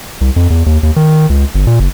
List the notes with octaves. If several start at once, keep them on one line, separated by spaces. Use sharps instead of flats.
C2
F2
E2
D#2
D#2
D#3
C#2
G1
A#2
F#1